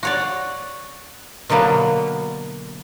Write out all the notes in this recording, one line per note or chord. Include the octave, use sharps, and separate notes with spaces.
F#4 C#5 D5
B2 D3 F#3 A#3 B3